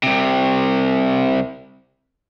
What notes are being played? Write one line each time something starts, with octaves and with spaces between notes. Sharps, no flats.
C2 C3